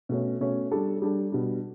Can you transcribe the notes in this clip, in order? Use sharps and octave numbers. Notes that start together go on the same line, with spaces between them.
B2 A3 C#4
B2 A3 C#4
G3 D4 A4
G3 D4 A4
B2 G3 D4